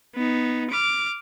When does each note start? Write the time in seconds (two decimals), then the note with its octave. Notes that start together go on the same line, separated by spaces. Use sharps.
0.15 B3 D#4
0.70 D6 F6